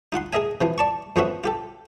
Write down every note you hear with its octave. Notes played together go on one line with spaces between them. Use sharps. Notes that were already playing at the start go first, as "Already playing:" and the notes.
D#4 F4 F#5 C6
G#4 A#4 D#5 E5 G#5
C3 E3 F3
D5 A5 C#6
F2 F3 B3 C#4 F#4 E5
F4 G4 A4